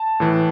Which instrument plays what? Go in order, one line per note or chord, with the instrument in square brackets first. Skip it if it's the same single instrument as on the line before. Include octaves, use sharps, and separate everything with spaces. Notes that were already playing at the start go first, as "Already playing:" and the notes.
Already playing: [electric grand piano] A5
A2 E3